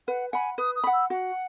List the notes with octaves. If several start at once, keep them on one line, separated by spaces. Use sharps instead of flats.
B4 F#5
F#5 G#5 B5
B4 D#6
D#6
F#5 B5
E6
F#4 F#5